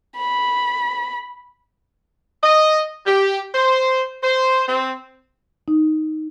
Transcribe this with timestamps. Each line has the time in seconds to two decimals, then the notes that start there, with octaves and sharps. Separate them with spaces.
0.17 B5
2.42 D#5
3.06 G4
3.55 C5
4.23 C5
4.68 C4
5.68 D#4